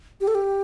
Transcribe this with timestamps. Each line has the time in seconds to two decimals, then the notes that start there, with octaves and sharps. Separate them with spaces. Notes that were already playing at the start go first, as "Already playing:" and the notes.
0.21 G4
0.28 A4
0.35 G4